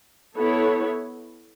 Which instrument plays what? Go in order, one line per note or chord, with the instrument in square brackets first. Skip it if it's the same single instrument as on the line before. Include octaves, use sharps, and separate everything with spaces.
[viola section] B3 E4 A4 C#5